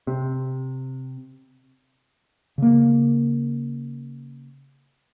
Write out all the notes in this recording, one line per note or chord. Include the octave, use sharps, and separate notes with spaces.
C3
C#3 A#3